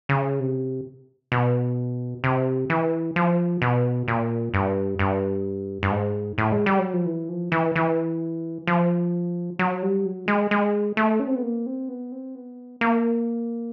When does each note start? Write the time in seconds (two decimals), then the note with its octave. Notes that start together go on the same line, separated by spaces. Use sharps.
0.09 C#3
0.40 C3
1.32 B2
2.24 C3
2.70 E3
3.16 F3
3.62 B2
4.08 A#2
4.54 G2
4.99 G2
5.83 G2
5.91 G#2
6.38 A2
6.52 G#3
6.66 G3
6.79 F#3
6.93 F3
7.06 E3
7.29 F3
7.52 E3
7.76 E3
8.67 F3
9.59 F#3
9.83 G3
10.05 F#3
10.28 G#3
10.51 G#3
10.97 A3
11.20 C#4
11.27 C4
11.36 B3
11.43 A#3
11.66 C4
11.89 B3
12.12 C4
12.35 B3
12.81 A#3